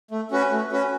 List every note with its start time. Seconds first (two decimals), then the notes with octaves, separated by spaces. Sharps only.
0.11 A3
0.31 C#4 F#4 B4
0.51 A3
0.72 C#4 F#4 B4